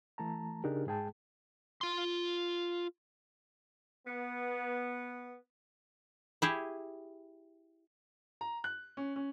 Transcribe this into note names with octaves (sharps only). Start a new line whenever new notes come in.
E3 A3 A5 A#5
C#3 D4 D#4 G4 G#4 A#4
G#2 G#3 G#4 G5 A5
F4 C6
B3
E4 G4 G#4
A#5
F#6
C#4
C#4